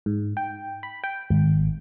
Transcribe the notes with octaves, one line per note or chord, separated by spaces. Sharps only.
G#2
G5
B5
G5
G#1